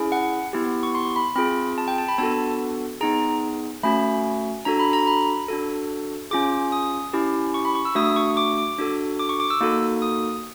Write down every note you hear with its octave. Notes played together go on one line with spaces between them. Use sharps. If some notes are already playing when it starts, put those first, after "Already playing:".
Already playing: C#4 E4 G#4
F#5
B3 E4 G4
C#6
C6
B5
C4 F4 G#4 B5
A5
G5
A5
B5
B3 D4 F#4 A4 A5
B3 D#4 G#4 A#5
A3 C#4 F#4 B5
D4 F#4 A4 A#5
B5
A#5
B5
D4 F#4 A4
C#4 F4 G#4 D6
D#6
C#4 E4 G4
C#6
B5
C#6
E6
A3 D4 F#4 D#6
C#6
D6
D6
D4 F#4 A4
D6
C#6
D6
E6
A#3 D#4 F#4 A4
D#6